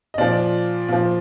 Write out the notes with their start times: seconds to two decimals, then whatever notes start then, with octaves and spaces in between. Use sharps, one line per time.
0.14 D#5
0.18 A#2 F3 D5
0.88 A#2 F3